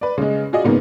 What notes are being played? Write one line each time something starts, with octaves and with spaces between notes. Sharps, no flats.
B4 D5
C#3 G#3
F4 F#4 G#4 D5 D#5
G#2 C#3 A#3 B3